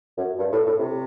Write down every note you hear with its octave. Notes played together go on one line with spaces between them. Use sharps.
F#2
G2
A2
A2
C3